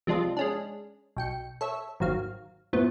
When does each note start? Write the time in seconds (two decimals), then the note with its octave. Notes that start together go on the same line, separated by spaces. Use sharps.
0.07 C3 F3 G#3 D4 F4
0.37 G#3 C#4 D4
1.17 B1 G5 C#7
1.61 A4 C#5 E5
2.00 G#1 D#2 F#3 F5
2.73 F#2 A2 F3 B3